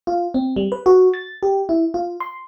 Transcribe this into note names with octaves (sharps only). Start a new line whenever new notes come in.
F4
C4
G3
B4
F#4
A6
G4
E4
F4
C6